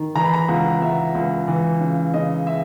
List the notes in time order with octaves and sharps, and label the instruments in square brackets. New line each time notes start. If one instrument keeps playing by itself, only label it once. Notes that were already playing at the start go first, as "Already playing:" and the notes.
Already playing: [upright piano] D#3
E3 A#5
B5
A#5
C#2 F#5
F#5
C#2 E5
C#2
E3
C#3
C#3 D#5
E5